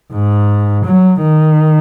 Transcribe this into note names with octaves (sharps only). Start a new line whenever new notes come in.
G#2
F#3
D#3